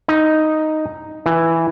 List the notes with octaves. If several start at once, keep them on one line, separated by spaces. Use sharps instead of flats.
D#4
E3